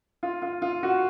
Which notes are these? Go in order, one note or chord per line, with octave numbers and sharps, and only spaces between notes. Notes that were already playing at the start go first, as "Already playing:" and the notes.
F4
F4
F4
F#4